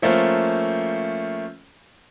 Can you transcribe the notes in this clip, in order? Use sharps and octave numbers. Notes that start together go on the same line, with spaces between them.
F3 A3 A#3 C#4 C5